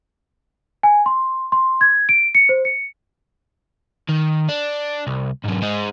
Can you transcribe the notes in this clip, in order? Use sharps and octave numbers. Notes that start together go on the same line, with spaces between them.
G#5
C6
C6
G#6
D7
C#7
C5
C#7
D#3
D4
C2
G#2 F#3
G#3 D#4